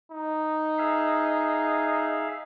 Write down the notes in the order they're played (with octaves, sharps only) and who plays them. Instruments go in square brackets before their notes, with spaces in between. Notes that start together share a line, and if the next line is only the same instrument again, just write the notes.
[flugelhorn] D#4
[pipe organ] G#4 E5 F5